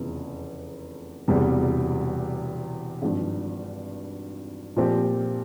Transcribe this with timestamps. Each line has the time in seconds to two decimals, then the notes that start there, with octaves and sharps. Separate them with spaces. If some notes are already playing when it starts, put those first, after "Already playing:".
Already playing: F1 E2 C#3 F3
1.28 E1 E2 C3 G3
3.02 G#1 G2 F3
4.76 A#2 F3 C4 G4